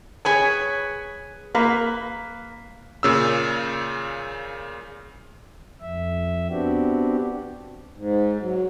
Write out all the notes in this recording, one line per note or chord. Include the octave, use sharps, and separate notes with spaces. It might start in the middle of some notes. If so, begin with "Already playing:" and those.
G#4 B4 C#5 G#5
A#3 B4
A#2 C#3 E6
F2 E5
B3 C4 D4 F#4 G4
G#2
F#3